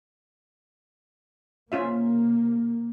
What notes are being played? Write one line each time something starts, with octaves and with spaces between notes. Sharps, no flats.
C3 A#3 C#4 F4 E5